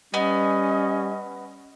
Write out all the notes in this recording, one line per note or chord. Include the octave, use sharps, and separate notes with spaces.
G3 B3 C#4 D#5